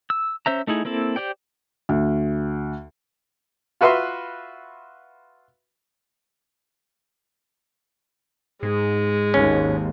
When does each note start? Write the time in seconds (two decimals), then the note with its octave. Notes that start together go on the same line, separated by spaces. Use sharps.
0.10 E6
0.46 C#4 C5 E5 A#5
0.67 A3 D#4 E4 G#4
0.85 A#3 C4 E4 A4
1.16 G4 C5 D5 G5
1.89 D2
3.81 F4 F#4 B4 E5 F5 C6
8.63 G#2 G#3
9.34 G#1 D#2 C#4